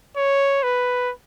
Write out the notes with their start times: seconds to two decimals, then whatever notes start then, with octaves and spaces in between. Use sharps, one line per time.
0.17 C#5
0.63 B4